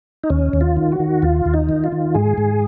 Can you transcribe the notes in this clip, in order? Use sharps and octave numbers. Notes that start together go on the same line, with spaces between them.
D#4
D#2 C#4
D#2
F4
D#3
F#4
D#3
D#2 F4
D#2
D#4
D#3
F4
D#3
G#2 G#4
G#2